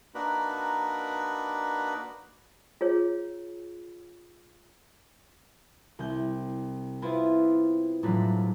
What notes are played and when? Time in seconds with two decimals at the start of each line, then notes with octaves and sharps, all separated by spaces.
0.15 A#3 D4 D#4 F#4 A#4 B4
2.81 F4 G#4 C#5
5.99 C2 G6
7.02 B3 C4 E4 F4 B4 C5
8.03 E1 A2 F3 F#3 D4 B6